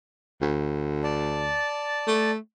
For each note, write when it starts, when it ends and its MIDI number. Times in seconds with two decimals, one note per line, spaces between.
0.41 1.59 38
1.04 2.31 74
1.04 2.31 81
2.07 2.36 57